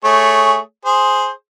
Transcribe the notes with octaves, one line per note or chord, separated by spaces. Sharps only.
A3 G#4 C#5
G#4 C5